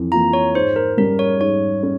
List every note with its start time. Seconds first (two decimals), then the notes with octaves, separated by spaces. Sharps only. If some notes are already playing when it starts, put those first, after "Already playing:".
Already playing: F2 E3
0.12 E3 A#3 F4 A#5
0.33 C#5
0.55 G#2 C5
0.76 A#4
0.98 G3 C#4 A#4
1.19 C#5
1.41 G#2 C#5
1.83 C#4